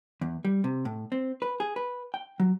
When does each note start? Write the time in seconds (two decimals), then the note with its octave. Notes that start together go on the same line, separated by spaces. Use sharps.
0.21 E2
0.45 G3
0.64 C3
0.85 A2
1.12 C4
1.42 B4
1.60 G#4
1.76 B4
2.14 G5
2.40 F#3